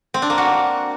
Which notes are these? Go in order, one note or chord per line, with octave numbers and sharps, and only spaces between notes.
C4
D4
A#3
F#4